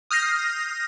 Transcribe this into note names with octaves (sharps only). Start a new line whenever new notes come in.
D#6 F6 G6 A#6 C7